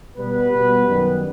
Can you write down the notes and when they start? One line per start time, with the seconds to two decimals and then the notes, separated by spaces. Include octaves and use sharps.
0.17 B2 G3 B3 B4
0.52 B2 G3 B3
0.87 F#2 D#3 G3 B3